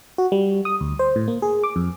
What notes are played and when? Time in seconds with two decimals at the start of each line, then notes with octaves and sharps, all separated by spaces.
0.18 F#4
0.32 G3
0.65 D#6
0.81 D2
0.99 C5
1.16 A2
1.28 A#3
1.42 G#4
1.64 D6
1.76 F2